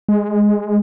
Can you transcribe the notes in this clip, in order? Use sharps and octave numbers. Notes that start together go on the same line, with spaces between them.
G#3